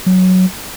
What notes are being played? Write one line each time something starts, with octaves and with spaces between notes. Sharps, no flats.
F#3